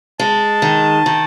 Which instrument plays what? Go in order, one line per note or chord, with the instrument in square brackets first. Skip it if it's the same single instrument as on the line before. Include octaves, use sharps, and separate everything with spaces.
[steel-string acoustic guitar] G#3 [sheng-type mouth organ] A5
[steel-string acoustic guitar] D#3
D#3